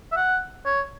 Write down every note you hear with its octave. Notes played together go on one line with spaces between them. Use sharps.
E5
F#5
C#5